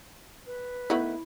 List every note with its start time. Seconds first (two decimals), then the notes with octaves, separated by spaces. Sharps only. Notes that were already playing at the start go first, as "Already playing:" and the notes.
0.46 B4
0.90 D#3 A3 B3 E4